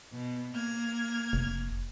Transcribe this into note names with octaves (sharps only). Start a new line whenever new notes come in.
B2
A#3 F6 G#6
F1